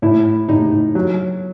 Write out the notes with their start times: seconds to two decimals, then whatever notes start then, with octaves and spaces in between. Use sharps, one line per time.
0.02 A2 E4
0.49 A2 D#4
0.95 F#3